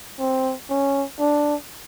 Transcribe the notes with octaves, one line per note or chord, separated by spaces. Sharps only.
C4
C#4
D4